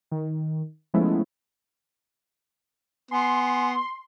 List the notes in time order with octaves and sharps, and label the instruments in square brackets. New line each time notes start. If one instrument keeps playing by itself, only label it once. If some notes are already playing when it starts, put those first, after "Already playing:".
[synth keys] D#3
F3 G#3 A3 B3 C#4 E4
[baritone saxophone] B3 [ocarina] G#5 [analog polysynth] C6